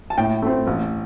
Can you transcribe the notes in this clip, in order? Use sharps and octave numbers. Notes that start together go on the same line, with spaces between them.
A5
A2 G5
A3 C4
A1